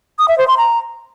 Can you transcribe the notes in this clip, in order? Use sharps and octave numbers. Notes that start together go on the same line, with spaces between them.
D#6
E5
C5
C6
A#5